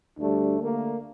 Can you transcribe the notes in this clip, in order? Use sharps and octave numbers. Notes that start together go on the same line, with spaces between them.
D2 G3 A3 D4
D3 A3 A#3